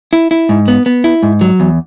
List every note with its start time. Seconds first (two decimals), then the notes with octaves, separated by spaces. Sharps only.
0.13 E4
0.31 E4
0.49 G#2
0.68 B3
0.86 B3
1.04 E4
1.23 G#2
1.41 F#3
1.60 E2